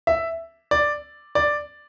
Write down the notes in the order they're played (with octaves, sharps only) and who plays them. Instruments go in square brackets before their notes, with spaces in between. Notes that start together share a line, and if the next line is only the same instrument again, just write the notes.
[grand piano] E5
D5
D5